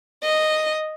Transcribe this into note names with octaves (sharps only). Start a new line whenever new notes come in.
D#5